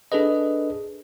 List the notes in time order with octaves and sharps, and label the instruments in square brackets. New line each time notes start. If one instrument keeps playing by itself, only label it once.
[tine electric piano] D4 G#4 A4 B4 D#5